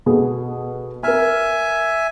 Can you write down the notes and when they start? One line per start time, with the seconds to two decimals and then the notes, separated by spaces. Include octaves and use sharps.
0.06 B2 G#4 A4
1.03 A#4 E5 G#5 F6